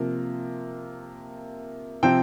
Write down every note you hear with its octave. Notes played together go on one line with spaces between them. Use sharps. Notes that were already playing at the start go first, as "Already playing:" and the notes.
Already playing: C3 F3 A#3
C3 F3 C4 G5